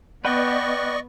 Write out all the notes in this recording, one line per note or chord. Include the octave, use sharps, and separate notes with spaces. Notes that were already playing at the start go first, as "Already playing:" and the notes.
B3 B4 D5 D#5 F#5 G5 C#6